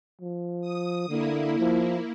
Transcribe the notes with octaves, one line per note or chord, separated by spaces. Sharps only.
F3
D#6
D3 A#3 E4
F3